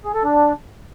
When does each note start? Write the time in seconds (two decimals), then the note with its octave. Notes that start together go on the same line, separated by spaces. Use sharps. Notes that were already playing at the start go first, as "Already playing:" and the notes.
0.05 G#4
0.14 A4
0.24 D4